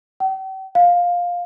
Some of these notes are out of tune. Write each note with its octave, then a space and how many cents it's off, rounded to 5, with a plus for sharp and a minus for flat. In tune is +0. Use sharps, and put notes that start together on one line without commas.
G5 -45
F5 +10